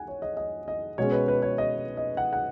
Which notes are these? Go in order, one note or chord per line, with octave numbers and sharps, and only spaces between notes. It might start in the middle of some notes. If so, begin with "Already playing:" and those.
Already playing: F#5 G#5
C#5
D#5
D#5
D#5
B2 G#3 C#4 C#5
B4
B4
C#5
D#5
D#5
F#5
F#5